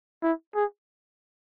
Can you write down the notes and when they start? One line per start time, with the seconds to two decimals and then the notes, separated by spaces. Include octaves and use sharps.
0.23 E4
0.55 G#4